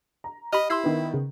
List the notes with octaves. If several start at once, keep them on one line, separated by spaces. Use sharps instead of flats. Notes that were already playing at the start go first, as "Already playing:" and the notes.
A#5
G4 D#5 B5 F6
E4 C6 E6 C7
D#3 B3
C#3